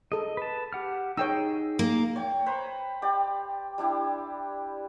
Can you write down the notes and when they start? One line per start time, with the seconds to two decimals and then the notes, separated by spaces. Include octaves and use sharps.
0.12 G#4 A4 D#5
0.37 B4 A5
0.73 G4 F#5 F6
1.17 D#4 G#4 C#5 G5 E6
1.79 A#3
2.16 C#5 G5
2.46 B4 C5 A#5 B5
3.02 G4 D5 G5
3.78 G3 D4 E4 G4